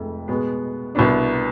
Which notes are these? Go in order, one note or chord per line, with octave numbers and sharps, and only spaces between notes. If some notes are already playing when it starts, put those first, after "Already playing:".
Already playing: F1 F2 C3 G#3
B2 G#3 B3
C2 B2 B3 D4